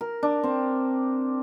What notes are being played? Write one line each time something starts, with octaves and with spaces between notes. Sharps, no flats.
A#4
D4
C4